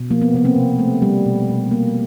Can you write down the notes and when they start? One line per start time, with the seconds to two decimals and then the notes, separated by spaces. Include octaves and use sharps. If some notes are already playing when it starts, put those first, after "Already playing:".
Already playing: B2
0.10 F3 A#3
0.22 B3
0.34 C3 B3
0.44 A#3 C4
0.56 C3
0.79 A3
1.02 G3
1.25 B2
1.49 B2
1.71 A#3